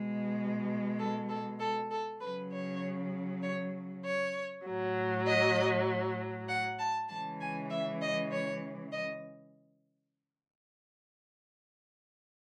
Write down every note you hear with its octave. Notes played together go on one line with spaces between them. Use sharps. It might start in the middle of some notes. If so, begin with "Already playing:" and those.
Already playing: B2 G#3
A4
A4
A4
A4
C#3 F#3 B4
C#5
C#5
C#5
A2 F#3
D#5
F#5
A5
C#3 E3 G#3 A5
G#5
E5
D#5
C#5
D#5